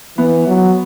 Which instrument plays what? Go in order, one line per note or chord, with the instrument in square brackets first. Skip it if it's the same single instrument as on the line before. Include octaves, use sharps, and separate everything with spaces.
[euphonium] E3 [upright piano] B3
[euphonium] F#3